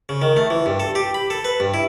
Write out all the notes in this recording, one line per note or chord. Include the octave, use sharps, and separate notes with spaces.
C#3
D#3
A3
E3
G2
A4
G4
B5
A4
B4
G2
E4